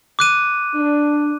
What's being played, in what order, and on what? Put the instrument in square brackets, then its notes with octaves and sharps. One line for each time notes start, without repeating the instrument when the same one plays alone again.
[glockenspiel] D6 F#6 D#7
[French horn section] D4